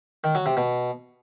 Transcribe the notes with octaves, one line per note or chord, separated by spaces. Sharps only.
D#3
F#3
C3
B2